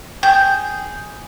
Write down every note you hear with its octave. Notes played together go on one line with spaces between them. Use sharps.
G#4 G5 G6